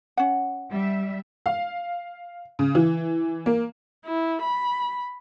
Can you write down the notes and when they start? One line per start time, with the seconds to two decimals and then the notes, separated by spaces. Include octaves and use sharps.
0.17 C#4 F#5
0.70 G3 E5
1.46 F5
2.59 C#3
2.75 E3
3.46 A#3
4.06 E4
4.42 B5